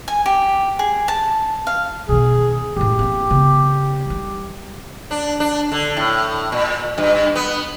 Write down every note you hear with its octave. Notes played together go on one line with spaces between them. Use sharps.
G#5
G4
G#4
A5
F5
B2 D#3 G#4
F#2 A2 G4
A#3 C4
C#3 B3
D#3 G3
D4
D4
D3
A2
A#2
G2
B3